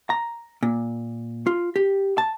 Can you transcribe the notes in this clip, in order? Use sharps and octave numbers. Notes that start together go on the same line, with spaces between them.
A#5
A#2
F4
G4
A5